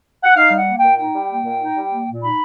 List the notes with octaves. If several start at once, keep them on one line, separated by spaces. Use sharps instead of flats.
F#5
D#4 F5
G3
F#5
A#3
G5
A#2
D#4 G5
G3
A#3
A#2
D#4
G3
A#3
A#2
D#4 B5